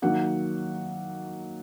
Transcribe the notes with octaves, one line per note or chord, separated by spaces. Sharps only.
D#3 F#3 A#3 F#5